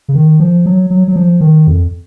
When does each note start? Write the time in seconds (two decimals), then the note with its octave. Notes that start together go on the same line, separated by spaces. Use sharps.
0.08 C#3
0.15 D#3
0.40 F3
0.66 F#3
0.90 F#3
1.08 F#3
1.16 F3
1.41 D#3
1.67 F2